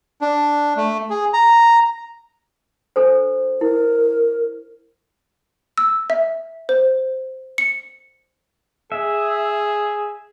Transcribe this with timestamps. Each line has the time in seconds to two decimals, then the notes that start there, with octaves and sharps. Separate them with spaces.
0.21 D4
0.76 A3
1.10 G#4
1.33 A#5
2.96 D4 A4 C5
3.61 E4 A#4
5.78 E6
6.10 E5
6.69 C5
7.58 C#7
8.92 G#4 E5